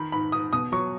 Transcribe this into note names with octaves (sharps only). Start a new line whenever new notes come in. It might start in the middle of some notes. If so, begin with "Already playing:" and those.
Already playing: D#3 B5
G#2 B5
G#2 D#6
B2 D#6
F#3 C#6